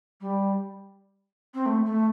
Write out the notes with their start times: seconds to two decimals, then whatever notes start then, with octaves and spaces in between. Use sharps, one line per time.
0.21 G3
1.54 C4
1.66 A3
1.85 A3